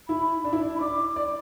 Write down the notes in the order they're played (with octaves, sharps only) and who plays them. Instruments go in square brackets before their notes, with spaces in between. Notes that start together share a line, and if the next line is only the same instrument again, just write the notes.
[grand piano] E4 [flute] B5
[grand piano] D4
E4
D4
[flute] B5
[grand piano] D5 [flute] D6
[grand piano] D5